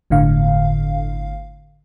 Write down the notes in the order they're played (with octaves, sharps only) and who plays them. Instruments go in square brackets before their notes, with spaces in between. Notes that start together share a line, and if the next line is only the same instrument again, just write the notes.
[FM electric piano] G1 A2 D3 F5